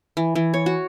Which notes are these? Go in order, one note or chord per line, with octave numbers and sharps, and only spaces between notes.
E3
E3
C#5
F#4